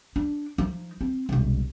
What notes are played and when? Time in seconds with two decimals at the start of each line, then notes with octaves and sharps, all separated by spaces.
0.16 D4
0.58 F3 D#4
1.01 C4
1.29 E1 C2